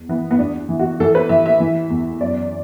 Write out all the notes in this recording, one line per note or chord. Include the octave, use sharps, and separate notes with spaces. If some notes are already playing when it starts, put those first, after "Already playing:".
Already playing: E2
E3 B3
B3
E2 D4
E3
F#4
E3 A4
B4
E3 E5
E5
E3
E2
F#2 D5